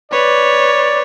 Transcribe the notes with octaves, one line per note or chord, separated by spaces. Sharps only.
B4 C#5 D5